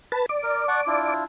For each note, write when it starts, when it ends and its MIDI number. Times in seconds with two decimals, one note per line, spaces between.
0.12 0.26 71
0.12 0.26 81
0.29 1.14 74
0.43 0.64 70
0.68 0.80 78
0.68 0.80 81
0.68 0.80 85
0.87 1.24 62
0.87 1.24 64
0.87 1.24 65